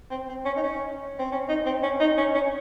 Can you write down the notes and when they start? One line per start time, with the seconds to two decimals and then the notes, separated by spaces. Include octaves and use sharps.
0.10 C4
0.29 C4
0.45 C#4
0.56 D#4
0.63 C#4
1.19 C4
1.32 C#4
1.48 D#4
1.65 C4
1.83 C#4
2.00 D#4
2.17 C#4
2.34 C#4